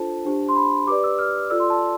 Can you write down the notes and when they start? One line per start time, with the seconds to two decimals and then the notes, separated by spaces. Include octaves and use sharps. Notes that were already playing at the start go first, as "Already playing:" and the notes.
Already playing: D4 F4 A4 C5 A5
0.25 D4 G4 C5
0.49 C6
0.56 B5
0.87 G4 B4 D5 D6
1.04 E6
1.19 F6
1.50 F4 A4 D5 E6
1.60 C6
1.70 A5